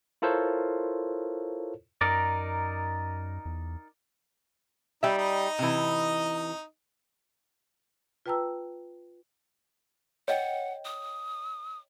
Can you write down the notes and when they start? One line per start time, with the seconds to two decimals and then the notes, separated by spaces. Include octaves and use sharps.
0.22 E4 F4 A4 A#4 C5 C#5
2.01 F#2 D#4 A#4 D5
3.45 E2
5.03 G3 D#4 E5
5.18 D#4 D#5
5.59 C3 E3
8.26 F4 B4 G5 A5 A#5 E6
10.28 C#5 D#5 F#5 G5
10.85 D#6